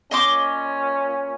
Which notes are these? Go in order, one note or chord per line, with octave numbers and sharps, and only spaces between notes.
A#2 C#4 D#5 C6 D6